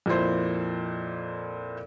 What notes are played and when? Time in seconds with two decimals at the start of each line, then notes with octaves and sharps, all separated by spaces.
0.06 F2 A#2 A#3 E4 C5